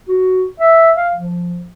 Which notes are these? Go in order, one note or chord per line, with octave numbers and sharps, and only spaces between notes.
F#4
E5
F5
F3